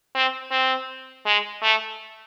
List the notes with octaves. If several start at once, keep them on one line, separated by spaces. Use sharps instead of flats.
C4
C4
G#3
A3